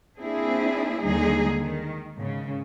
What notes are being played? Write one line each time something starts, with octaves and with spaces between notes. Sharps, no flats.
A#3 C4 D4 E4 G#4
D#2 D3 G3 G#3 D#4 G#4
D#3
G#2 C#3